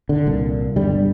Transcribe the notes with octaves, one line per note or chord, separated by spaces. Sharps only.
D3
C2 A#2
G1 G2 D3 G3